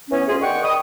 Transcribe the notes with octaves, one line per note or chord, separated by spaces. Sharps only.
E3 B3 C#4
D2 F4 G#4
D#3 D5 F#5 G5 C#6
D#5 G5 B5 D#6